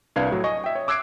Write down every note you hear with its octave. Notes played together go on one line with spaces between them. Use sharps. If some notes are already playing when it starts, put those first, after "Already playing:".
C2 D4 B4 F5 G#6
A2 F#3
D#5 G#5 C#6 D#6
E5 G5
C#5
D6 E6 F#6 G#6 C7 D7